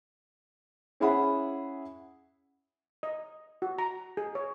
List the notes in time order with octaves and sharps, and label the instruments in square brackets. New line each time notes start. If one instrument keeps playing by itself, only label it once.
[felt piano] C#4 E4 G#4 E5 F#5 B5
[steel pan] D#5
F#4
A#5
G#4
C#5